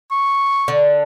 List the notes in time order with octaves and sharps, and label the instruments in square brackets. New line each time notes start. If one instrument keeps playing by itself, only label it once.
[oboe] C#6
[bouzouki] D3